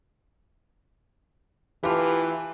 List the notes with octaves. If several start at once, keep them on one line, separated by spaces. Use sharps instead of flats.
E3 A3 F4 G4 B4